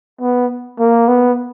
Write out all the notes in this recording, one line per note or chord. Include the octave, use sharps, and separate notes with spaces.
B3
A#3
B3